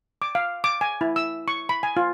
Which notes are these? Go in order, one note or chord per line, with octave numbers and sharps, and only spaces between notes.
D6
F5
D6
G#5
E4
E6
C#6
B5
G#5
F4